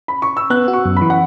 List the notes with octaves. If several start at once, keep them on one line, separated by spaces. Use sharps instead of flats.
B5
C#6
E6
B3 F#6
F#4
C#6
F#2
B5
E3
F#5